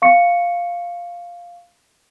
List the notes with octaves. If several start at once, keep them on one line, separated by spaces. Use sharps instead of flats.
F5 C#6 C#7